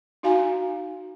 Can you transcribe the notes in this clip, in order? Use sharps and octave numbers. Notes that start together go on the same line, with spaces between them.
D#4 F#4 F5 G#5 A#5